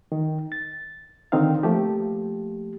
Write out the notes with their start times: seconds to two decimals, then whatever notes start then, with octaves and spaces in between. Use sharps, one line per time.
0.12 D#3
0.52 A6
1.32 D3 D#3 C4 D#4 F5
1.63 F3 A3 A#3 G4